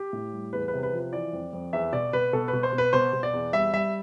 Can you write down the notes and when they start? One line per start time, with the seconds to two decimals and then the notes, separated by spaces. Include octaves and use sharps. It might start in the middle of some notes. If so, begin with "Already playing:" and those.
Already playing: G4
0.13 A2
0.33 G3
0.53 E2 B4
0.68 B4
0.73 C3
0.83 B4
0.93 F3
1.13 E3 D5
1.33 F2
1.53 F2
1.73 E2 E5
1.93 B2 D5
2.13 B2 B4
2.33 B2 A4
2.48 B4
2.53 B2
2.63 C5
2.73 B2
2.78 B4
2.93 B2 C5
3.13 B2
3.23 D5
3.34 E2
3.53 G3 E5
3.73 G3 E5